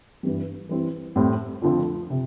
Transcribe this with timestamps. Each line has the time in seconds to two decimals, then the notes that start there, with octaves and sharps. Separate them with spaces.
0.23 G2 E3 G3
0.69 E3 G3 C4 E4
1.16 A2 G3 C4
1.62 F2 D3 F3 C4
2.10 C3